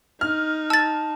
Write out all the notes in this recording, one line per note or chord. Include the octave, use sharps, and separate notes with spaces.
D#4 F6
A5 E6 A6